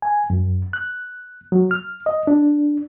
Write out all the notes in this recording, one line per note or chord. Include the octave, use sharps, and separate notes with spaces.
G#5
F#2
F#6
F#3
F6
D#5
D4